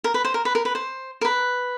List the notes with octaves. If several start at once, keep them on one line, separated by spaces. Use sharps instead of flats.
A#4
B4
C5
A#4
B4
A#4
B4
C5
A#4
B4